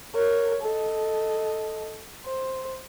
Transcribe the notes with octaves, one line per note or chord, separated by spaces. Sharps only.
A#4 C#5
A4 D#5
C5